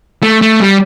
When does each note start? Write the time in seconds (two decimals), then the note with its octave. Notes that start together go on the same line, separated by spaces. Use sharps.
0.23 A3
0.42 A3
0.60 G3